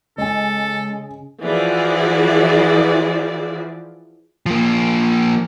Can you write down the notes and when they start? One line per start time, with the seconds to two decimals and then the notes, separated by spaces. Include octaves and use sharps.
0.18 C#3 G#3 A4 D#5 G#5
1.42 E3 F3 E4 F#4 G#4 D5
4.46 F3 A#3